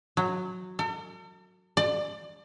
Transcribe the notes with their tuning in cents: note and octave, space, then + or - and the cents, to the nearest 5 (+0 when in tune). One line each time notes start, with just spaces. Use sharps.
F#3 -10
A4 +45
D5 +30